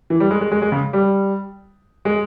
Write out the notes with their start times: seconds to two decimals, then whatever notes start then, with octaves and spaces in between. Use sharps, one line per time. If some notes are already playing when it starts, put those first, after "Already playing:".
0.10 E3
0.20 G3
0.31 G#3
0.41 G#3
0.52 G#3
0.62 G#3
0.72 C#3
0.93 G3
2.05 G#3